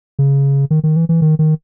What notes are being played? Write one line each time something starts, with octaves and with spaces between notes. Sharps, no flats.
C#3
D#3
D#3
E3
E3
D#3
D#3